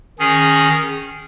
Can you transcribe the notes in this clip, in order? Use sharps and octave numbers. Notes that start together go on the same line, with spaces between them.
D#3 C#4 G#4